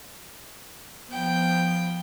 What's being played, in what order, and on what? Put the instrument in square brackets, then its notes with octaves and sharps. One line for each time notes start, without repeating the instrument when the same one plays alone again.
[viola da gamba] F3 B3 [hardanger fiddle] G5